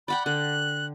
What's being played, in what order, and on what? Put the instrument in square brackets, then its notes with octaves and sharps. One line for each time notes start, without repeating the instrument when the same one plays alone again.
[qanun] D5 F#5 G5 [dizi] B5
[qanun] D3 [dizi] F#6